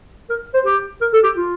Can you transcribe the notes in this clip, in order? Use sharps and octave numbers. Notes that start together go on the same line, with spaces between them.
A#4
C5
G4
A#4
A4
G4
F4